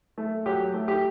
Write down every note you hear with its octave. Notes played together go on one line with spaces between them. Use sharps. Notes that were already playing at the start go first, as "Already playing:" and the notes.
A3
F#3 G4
A3
G4